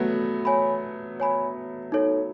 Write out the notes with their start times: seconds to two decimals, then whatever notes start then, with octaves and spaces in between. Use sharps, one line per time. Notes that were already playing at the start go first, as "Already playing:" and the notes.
Already playing: F#3 A3 B3
0.45 C#5 G#5 B5
1.20 C#5 G#5 B5
1.92 D#4 A4 C#5